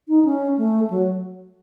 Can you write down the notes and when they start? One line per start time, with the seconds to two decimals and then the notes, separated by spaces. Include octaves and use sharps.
0.08 D#4
0.25 C#4
0.58 A3
0.90 F#3